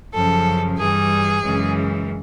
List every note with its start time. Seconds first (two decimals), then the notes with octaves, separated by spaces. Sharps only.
0.13 F#2 C#3 F3 A4
0.78 G2 E3 G3 G#4
1.43 F#2 C#3 E3 G#3